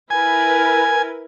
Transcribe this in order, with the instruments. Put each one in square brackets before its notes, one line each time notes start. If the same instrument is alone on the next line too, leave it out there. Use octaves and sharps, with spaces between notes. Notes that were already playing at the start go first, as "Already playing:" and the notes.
[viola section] E4 A#4 B4 [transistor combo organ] G#5